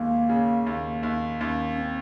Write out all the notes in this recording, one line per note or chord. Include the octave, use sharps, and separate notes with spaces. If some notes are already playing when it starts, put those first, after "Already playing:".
Already playing: D#2 G#3 A#3
C#3
D#2
D#2
D#2 C#4
C#4
C4